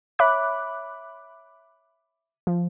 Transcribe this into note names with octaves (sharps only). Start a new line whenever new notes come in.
C#5 E5 B5 D6 F#6
F3